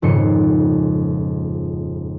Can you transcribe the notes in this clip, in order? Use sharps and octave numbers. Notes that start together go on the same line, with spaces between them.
D#1 F2 G#2 C#3 C6 C#7